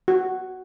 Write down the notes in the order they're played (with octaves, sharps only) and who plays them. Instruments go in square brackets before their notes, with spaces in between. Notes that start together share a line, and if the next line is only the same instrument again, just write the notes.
[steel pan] F#4